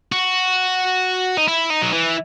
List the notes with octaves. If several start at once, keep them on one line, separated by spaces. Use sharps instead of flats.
F#4
D#4
E4
D#4
F#3
E3